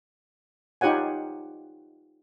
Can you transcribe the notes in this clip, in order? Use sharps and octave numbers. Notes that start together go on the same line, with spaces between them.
D#4 F4 G4 C#5 F#5 G#5